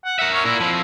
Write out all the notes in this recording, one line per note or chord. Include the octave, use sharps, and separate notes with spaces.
F#5
A#4 E5 F#5
C#4
A#2 E4 A#4
F3 C4